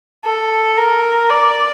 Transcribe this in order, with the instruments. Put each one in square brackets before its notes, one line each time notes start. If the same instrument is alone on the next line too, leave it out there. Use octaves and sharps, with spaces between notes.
[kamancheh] A4
A#4
D5